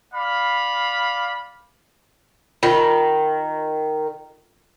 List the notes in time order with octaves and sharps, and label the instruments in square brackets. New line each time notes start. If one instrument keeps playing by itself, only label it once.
[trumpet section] D5 F5 B5
[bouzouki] D#3 [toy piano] F4